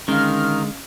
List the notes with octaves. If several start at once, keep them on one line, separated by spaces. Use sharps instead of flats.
D3 D#3 G#3 C#4 D#5 F5 F6